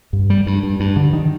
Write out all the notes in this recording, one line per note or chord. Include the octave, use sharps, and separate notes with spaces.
G2
G3
G2
G2
G2
D3
D#3